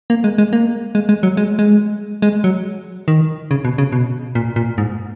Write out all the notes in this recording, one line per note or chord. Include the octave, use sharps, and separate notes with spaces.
A#3
G#3
G#3
A#3
G#3
G#3
F#3
G#3
G#3
G#3
F#3
D#3
C#3
B2
C#3
B2
A#2
A#2
G#2